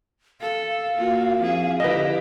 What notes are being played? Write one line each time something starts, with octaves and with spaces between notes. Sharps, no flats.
A4 F5
A#3 F4 F#4
F2 E4 G#4
D3 E4 G4 B4 D#5